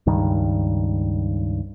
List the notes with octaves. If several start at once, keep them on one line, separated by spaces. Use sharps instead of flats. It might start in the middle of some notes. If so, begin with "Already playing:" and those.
C#2 G2 D#3